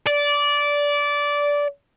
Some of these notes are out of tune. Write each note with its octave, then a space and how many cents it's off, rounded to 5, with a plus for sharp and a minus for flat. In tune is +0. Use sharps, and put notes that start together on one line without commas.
D5 -15